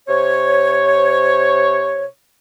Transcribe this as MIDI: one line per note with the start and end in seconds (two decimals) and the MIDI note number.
0.08 2.06 48
0.08 2.06 72
0.08 2.06 73